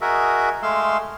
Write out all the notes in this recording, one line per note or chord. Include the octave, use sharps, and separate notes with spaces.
F#4 G#4 A#4 D#5 E5
G#3 A3 F5 C6 E6